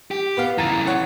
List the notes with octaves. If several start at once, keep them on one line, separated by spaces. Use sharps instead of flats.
G4
B3 F5
C#3 E3 A#5 A6
C#5 F#5